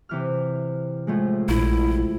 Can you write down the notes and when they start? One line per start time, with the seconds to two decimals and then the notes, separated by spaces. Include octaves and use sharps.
0.09 C3 E3 F6
1.07 A2 F3 G#3
1.49 A#1 E4